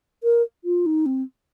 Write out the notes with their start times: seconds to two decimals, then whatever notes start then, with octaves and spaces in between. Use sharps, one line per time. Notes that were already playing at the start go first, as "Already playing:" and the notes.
0.23 A#4
0.64 F4
0.86 D#4
1.06 C4